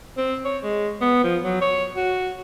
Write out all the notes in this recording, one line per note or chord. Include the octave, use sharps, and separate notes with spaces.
C4
C#5
G#3
B3
F3
F#3
C#5
F#4